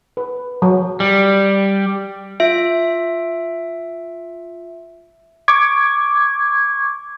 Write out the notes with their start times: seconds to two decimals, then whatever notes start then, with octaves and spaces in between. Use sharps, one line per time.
0.17 B4
0.62 F#3
1.00 G3
2.40 F4 E5 D7
5.48 C#6 D6 G#6